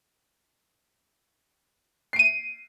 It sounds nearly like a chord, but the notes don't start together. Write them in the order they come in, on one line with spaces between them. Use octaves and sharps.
C7 D7 D#7